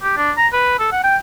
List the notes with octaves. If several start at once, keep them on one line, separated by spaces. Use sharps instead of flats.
G4
D4
A#5
B4
A4
F#5
G5